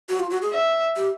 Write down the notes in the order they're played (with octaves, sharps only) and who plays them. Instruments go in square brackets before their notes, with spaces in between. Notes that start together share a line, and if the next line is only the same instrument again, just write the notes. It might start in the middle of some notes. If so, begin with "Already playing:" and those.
[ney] F#4
F4
F#4
G#4
[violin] E5
[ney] G4